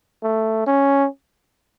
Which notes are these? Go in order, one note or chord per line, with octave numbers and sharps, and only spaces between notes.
A3
C#4